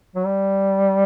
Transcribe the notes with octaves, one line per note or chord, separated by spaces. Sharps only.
F#3
G3